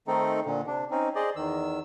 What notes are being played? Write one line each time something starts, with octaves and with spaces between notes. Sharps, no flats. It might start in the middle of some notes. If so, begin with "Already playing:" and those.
D#3 A3 C4 D#4 A4
A#2 D3
C3 D4
C4 C#4 D#4
G#4 C5 D5 D#5
E2 D#3 E6